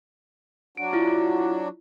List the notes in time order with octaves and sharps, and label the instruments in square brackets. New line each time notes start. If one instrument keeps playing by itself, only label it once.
[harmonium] F#3 D4 F#4 [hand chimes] D7
[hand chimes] E4 F4